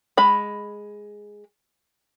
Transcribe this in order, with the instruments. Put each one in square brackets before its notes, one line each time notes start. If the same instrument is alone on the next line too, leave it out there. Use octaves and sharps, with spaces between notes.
[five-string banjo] G#3 B5